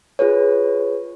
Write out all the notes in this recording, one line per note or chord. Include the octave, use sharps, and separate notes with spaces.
F4 G#4 B4 C#5